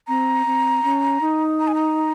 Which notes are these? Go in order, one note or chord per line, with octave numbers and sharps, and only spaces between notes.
C4 A#5
C4
C#4
D#4
A#5
G#5
A#5